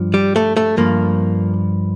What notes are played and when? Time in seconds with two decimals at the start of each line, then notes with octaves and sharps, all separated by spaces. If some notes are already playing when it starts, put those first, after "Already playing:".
Already playing: G2 F3
0.14 G3
0.36 A3
0.57 A3
0.77 G2 F3 A#3